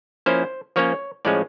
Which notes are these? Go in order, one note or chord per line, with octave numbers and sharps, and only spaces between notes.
F3 A#3 C#4 E4 C5
F3 A#3 C#4 C#5
A2 F3 G#3 C#4 D5